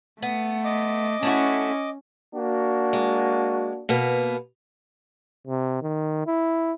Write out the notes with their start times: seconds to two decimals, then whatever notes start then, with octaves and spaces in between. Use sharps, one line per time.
0.22 A3 B3
0.64 D#5 D6
1.23 A3 C#4 E4 F#4
2.35 A#3 D4 F#4
2.93 G#3
3.89 B2 A#3 B3
5.47 C3
5.82 D#3
6.27 E4